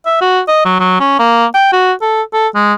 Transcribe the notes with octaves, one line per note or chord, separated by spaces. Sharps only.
E5
F#4
D#5
F#3
F#3
C#4
A#3
G5
F#4
A4
A4
G#3